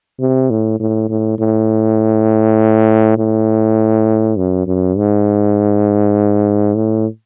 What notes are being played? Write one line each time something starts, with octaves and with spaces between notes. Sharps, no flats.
C3
A2
A2
A2
A2
A2
F#2
F#2
G#2
A2